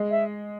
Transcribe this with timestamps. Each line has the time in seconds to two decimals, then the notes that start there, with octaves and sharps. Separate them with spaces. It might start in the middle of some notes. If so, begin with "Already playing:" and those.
Already playing: G#3
0.11 E5